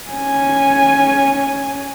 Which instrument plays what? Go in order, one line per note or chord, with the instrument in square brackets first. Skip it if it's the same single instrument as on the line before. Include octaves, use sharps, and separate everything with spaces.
[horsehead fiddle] C#4 G#5